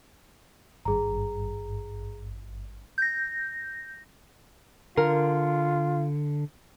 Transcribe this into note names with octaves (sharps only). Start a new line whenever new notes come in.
G#1 G2 G#4 A#5
G6 A#6
D3 F4 A#4